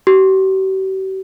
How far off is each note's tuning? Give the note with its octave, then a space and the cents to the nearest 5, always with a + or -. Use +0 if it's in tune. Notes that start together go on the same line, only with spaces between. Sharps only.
G4 -45